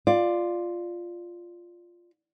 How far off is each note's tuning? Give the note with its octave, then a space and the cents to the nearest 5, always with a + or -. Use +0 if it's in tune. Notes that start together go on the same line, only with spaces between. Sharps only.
F4 +0 D5 +10